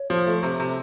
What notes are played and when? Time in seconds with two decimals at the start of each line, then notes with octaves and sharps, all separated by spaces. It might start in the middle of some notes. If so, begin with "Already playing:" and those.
Already playing: C#5
0.10 F3
0.27 A3
0.43 C3
0.60 C3